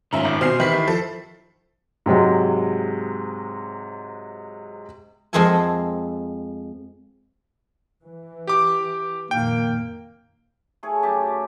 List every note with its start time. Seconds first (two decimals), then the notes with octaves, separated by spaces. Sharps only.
0.13 G#2 D#3 C#4 F4 E5 A#5
0.25 G1
0.41 B2 C4 G#5 F6 C7
0.60 D#3 E3 E4 G4 B6 C7
0.73 D#3
0.88 F3 A4
2.06 G#2 C3 F#3 G#3
5.33 F2 G#3 C4 G#4 A4 G#5
8.04 E3
8.47 G4 D6
9.31 F2 A#2 D#3 A#3 G5
10.83 A3 G#4 C#5
11.03 F#2 G4 A5